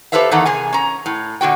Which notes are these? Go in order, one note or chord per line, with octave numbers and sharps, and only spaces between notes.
G4 A4 B4 C5 E5 F5
E2 D#3 E3 A4 F#5 A#5
C3 G#4 A#4 G#5
C#4 A#5
A2
A#2 D3 F#4 G5